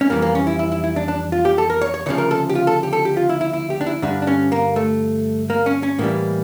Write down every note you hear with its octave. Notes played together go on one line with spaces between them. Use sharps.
C#4
F2 E3 G3 A#3
A#3
C#4
E4
E4
E4
E4
D4
D4
F4
G4
A4
A#4
C#5
C#5
D2 C#3 F3 C#5
A#4
A4
G4
F4
A4
G4
A4
G4
F4
E4
E4
E4
G4
D4
E4
G2 D3 G3 D4
D4
C#4
A#3
A3
A#3
C#4
C#4
A2 E3 G3 A#3